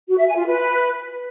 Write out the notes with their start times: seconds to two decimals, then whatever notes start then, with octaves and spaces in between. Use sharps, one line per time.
0.08 F#4
0.17 E5
0.27 G#5
0.37 F4
0.46 B4